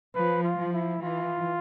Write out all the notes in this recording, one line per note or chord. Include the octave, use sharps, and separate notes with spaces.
F3 B4
F4
F3
E4
E3 F4